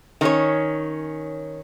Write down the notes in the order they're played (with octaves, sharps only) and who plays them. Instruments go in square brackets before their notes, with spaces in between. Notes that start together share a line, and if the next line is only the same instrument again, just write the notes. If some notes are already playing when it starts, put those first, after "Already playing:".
[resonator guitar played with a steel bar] D#3 C#4 C#5